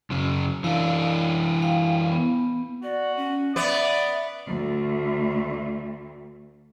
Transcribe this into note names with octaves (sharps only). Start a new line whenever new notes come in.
F#2 C#3
E3 D4 F5
F5 G5
B3
F#4 D5
C#4
B3 D5 E5
D2 A3